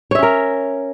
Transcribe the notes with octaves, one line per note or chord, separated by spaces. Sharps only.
C#4 A#4 C#5 E5